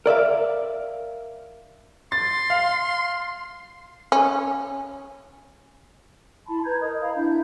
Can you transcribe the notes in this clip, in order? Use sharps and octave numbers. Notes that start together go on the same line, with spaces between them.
A#4 D5 E5 F5
C6 A6
F5
C#4
E4 A5 B5 C6
B4 A#5 G6 G#6
A#4 D#5 D#6
F5 A#5 B5
D4 E4 E5 G6